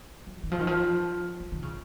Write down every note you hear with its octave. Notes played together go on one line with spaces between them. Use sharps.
F3
D#3
F3
D#3
F3
F3
D#3
C#3